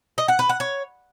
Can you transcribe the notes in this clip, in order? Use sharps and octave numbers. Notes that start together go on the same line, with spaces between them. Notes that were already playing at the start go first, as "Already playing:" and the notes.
D#5
F#5
B4
F#5
C#5